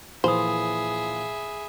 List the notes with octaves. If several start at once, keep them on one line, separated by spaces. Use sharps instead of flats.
A#2 E3 F3 G#4 C5 E5 B5 D#6